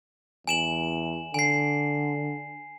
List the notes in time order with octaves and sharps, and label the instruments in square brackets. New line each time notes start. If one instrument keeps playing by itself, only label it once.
[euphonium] E2 [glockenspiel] G#5 E7 F#7
[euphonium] D3 [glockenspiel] G#5 C7